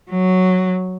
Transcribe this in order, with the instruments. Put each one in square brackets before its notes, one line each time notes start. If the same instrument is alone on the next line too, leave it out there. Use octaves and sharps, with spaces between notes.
[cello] F#3